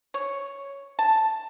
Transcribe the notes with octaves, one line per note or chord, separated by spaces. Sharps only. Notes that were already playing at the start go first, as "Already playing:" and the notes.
C#5
A5